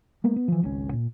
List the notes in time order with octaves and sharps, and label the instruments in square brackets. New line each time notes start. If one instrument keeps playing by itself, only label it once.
[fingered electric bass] G#3 A#3 B3
B3
E3 F3
G#1 C#2 D3 C#4
A#2